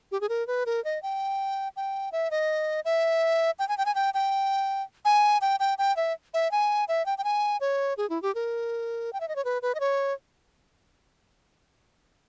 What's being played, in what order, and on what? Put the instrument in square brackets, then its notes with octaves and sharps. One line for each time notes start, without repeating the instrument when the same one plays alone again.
[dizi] G4
G#4
A#4
B4
A#4
D#5
G5
G5
E5
D#5
E5
G5
G#5
G5
G#5
G5
G5
G#5
G5
G5
G5
E5
E5
G#5
E5
G5
G5
G#5
C#5
G#4
E4
G4
A#4
G5
E5
D#5
C#5
B4
B4
D#5
C#5